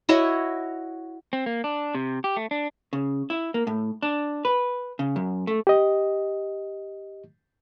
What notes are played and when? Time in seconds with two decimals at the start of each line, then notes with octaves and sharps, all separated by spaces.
0.09 E4 F#4 C#5 D#5
1.33 C4
1.46 A#3
1.64 D4
1.95 C3
2.24 G4
2.37 A3
2.51 D4
2.93 C#3
3.30 E4
3.54 A#3
3.67 A2
4.02 D4
4.45 B4
4.99 C#3
5.16 F#2
5.47 A3
5.67 G4 D#5